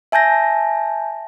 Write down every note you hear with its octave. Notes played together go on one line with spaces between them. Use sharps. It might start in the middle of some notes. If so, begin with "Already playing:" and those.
E5 G#5 A5 G6 A#6